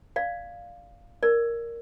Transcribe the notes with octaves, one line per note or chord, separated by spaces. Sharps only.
D5 F5
A#4 D5